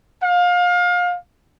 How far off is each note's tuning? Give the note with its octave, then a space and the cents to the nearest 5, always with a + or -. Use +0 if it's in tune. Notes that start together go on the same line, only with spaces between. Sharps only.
F5 +30